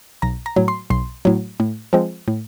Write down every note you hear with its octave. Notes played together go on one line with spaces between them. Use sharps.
B1 A#5
A#5
A2 F#3
C6
B1 C6
A2 F#3
A2
F3 G#3 C4
A2